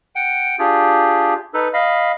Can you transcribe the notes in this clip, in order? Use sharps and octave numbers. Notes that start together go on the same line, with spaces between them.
F#5 G5
D4 F4 G4 G#4
D#4 A4 B4
D#5 F5 B5